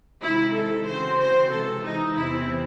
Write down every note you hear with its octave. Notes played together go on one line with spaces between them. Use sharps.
C3 D#3 G#3 D#4 E4
A4
C#3 E3 C4 F#4 C5
C5
C3 E3 G#3 A4
D#4
E2 C3 E3 C4 E4